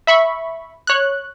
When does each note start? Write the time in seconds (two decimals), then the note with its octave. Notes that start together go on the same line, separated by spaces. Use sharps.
0.07 E5 B5 C#6
0.87 C#5 F#6